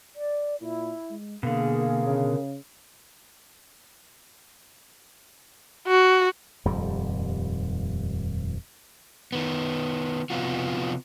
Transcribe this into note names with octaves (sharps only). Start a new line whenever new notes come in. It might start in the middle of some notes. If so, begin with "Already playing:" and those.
D5
A#2 E4
G#3
B2 D3 A#3 G#4 A#4 F5
C#3
F#4
D#1 F2 G#2 G3
D#3 B3
C3 F3 B3 F4 F#4